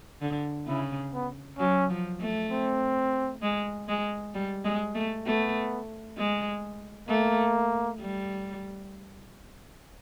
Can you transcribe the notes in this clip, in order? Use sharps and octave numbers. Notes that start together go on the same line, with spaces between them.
D3
C#3 E4
B3
F#3 C#4
F3
A3
C4
G#3
G#3
G3
G#3
A3
A3 B3
G#3
A3 A#3
G3